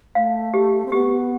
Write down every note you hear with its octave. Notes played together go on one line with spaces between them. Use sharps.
A3 F5
G4
C4
B3 G4